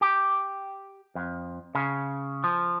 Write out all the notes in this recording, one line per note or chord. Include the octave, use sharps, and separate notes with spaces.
G4
F2
C#3
F3